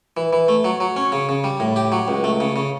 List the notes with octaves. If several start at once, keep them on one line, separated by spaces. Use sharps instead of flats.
E3
E3
A3
F#3
F#3
C#4
C#3
C#3
G3
A2
G4
F#3
C#2
A3
C#3
C#3